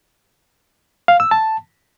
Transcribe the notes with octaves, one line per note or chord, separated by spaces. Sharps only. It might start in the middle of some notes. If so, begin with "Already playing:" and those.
F5
E6
A5